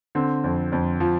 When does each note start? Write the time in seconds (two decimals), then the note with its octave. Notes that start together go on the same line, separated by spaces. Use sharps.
0.15 D3 C4
0.44 F2
0.72 F2
1.00 F3